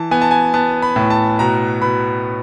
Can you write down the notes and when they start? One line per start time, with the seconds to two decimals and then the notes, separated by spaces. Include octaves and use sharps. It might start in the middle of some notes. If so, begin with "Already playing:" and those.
Already playing: E3 A5
0.11 B3 G#5
0.21 A5
0.31 G#5
0.54 B3 A5
0.82 B5
0.96 A2
1.10 A5
1.39 B2 A#5
1.82 B2 B5